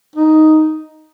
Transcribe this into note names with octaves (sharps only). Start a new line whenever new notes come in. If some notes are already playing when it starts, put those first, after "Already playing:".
D#4